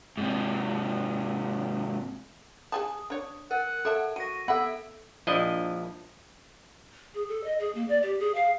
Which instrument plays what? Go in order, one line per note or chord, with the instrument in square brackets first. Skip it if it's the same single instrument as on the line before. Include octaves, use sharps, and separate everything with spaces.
[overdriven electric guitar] G#2 C3
[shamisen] G#4 G#5 A5 [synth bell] D#6
[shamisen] D4 C#5
[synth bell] A#4 [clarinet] F#5
[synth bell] A4 [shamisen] C#5 E5 A5
[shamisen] F#3 [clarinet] F#4 [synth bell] A#6 D#7
[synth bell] B3 A4 [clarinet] E5 [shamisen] F#5 B5
[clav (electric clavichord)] A#1 F3 D4 E4 D#5
[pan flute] G#4
A4
D#5
G#4
A#3
D5
G4
G#4
F5